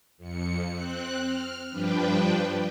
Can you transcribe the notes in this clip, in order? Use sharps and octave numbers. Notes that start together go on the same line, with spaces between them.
F2 C#7
C4 F#6
F6
G2 F3 D4 B4 G5